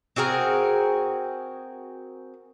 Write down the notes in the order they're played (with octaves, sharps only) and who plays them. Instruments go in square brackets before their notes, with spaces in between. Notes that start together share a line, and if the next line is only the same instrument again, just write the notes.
[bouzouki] C4 F#4 G#4 A#4